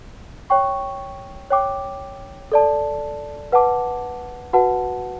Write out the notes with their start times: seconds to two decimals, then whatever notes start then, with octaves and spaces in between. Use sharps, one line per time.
0.50 C#5 G5 C#6
1.50 C#5 G5 D6
2.52 A4 D5 A5
3.52 B4 F#5 A5 D6
4.53 F#4 B4 F#5 A5